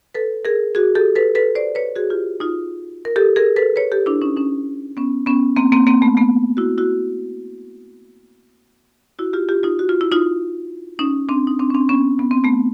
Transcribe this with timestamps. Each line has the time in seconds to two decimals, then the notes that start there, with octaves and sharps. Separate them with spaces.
0.15 A4 B4
0.45 G#4 A#4
0.75 F#4 G#4
0.95 G4 A4
1.16 A4 B4
1.35 A4 B4
1.55 C5 D5
1.75 B4 C#5
1.96 F#4 G#4
2.10 F4 G4
2.40 D#4 F4
3.05 A#4
3.16 G4 A4
3.36 G#4 A#4
3.56 A4 B4
3.76 B4 C#5
3.92 G4 A4
4.06 D4 E4
4.21 C#4 D#4
4.37 C#4 D#4
4.97 B3 C#4
5.26 B3 C#4
5.56 A#3 C4
5.72 A#3 C4
5.87 A#3 C4
6.02 A3 B3
6.17 A3 B3
6.57 E4 F#4
6.78 E4 F#4
9.19 E4 F#4
9.33 F4 G4
9.48 F4 G4
9.63 D#4 F4
9.79 F#4
9.89 F4
10.01 E4
10.12 D#4 F4
10.99 C#4 D#4
11.29 C4 D4
11.47 D#4
11.59 C4 D4
11.70 C#4
11.74 C4 D4
11.89 B3 C#4
12.19 B3
12.31 C4
12.44 A3 B3